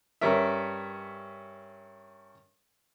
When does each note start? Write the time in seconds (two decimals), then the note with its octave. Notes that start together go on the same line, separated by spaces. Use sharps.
0.21 G2 C#4 A#4 E5